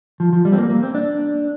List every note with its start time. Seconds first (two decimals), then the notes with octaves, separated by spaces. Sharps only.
0.20 F3
0.33 F3
0.45 G3
0.52 C4
0.58 A#3
0.70 A#3
0.83 C4
0.95 D4